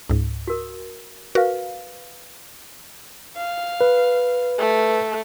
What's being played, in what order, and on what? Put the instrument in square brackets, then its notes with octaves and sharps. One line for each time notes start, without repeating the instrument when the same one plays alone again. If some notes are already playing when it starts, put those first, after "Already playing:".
[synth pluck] C#2 G#2
[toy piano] F#4 A#4 D#6
[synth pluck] F#4 A#4 [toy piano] B4 F5
[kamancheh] F5
[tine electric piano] B4
[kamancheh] A3